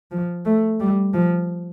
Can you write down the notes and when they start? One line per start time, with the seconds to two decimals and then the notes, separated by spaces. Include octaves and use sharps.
0.11 F3
0.45 A3
0.80 G3
1.13 F3